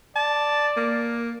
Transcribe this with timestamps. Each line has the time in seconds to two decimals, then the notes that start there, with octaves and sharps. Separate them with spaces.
0.16 D5 A5
0.77 A#3